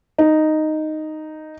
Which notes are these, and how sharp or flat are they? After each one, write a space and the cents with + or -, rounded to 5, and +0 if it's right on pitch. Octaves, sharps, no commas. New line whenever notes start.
D#4 -5